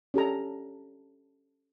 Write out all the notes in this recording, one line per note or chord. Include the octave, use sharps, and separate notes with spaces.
C#4 G4 A4 A#5